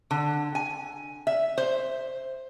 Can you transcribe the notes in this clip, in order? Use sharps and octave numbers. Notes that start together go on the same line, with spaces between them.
D3
G#5
E5
C5